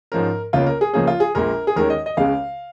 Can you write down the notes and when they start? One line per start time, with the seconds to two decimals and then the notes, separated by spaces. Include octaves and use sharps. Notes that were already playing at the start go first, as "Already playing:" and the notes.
0.12 G#2 F3 C#4 A#4
0.53 C#2 C#3 A#3 C#4 F4
0.66 A#4
0.81 G#4
0.93 C#2 C#3 F3 A#3 C#4 G#4
1.07 F4
1.20 G#4
1.35 A#1 A#2 G#3 A#4
1.67 G#4
1.76 D#2 D#3 G#3 C#4 A#4
1.90 D#5
2.06 D#5
2.17 C#2 C#3 G#3 C#4 F5